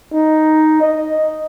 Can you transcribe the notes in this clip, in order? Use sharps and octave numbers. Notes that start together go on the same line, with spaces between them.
D#4
D#5